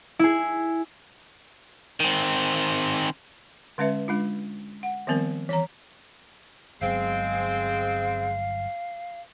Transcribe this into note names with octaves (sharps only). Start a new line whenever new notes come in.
E4 G#4
D#3 C4
D3 G#3 C#4 B4 E5
G#3 D4 F4
F#5
D#3 F3 G3 B3 C4 A#4
E3 C#5 A#5
G1 F#3 G#3 B3 C4 F5